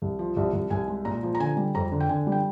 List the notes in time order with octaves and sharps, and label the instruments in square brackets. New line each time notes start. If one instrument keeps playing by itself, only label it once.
[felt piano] C2
F3
C2
C2
C2 G#5
G#3
A#2 A#5
F3
A#5
D3 G#5
G3
F2 A#5
D3
G5
D3 G#5
G3
G5